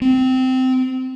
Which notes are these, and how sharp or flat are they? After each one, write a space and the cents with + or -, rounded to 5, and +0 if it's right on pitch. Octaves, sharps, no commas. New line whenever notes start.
C4 -15